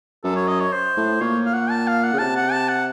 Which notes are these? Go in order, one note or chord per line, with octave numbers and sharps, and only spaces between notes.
F#2 A4
C#5
D#5
C#5
C5
A2
A#2 C#5
F5
F#5
A5
F5
F#5
C#3
C3 A5
F#5
A5
F#5